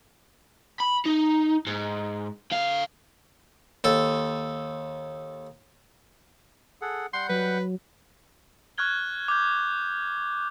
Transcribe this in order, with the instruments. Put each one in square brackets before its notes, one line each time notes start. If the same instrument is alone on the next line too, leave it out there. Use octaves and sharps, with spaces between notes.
[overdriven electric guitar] B5
D#4
G#2
D3 F5
[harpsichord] D#2 A4
[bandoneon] G#4 A4 F#5
[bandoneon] G3 F#5 G6 [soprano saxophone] C6
[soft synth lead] F#3 [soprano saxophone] B4
[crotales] C#6 F6 F#6 G#6 G7
D6 G6